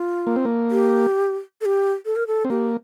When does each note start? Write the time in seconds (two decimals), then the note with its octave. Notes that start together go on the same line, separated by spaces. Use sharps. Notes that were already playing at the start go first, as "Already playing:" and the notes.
Already playing: F4
0.27 A#3
0.36 C4
0.45 A#3
0.71 G4
1.61 A4
1.65 G4
2.06 A4
2.16 A#4
2.27 A4
2.45 C4
2.50 A#3 G4